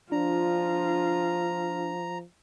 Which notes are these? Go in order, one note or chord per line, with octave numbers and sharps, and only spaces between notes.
F3 D4 F4 A#5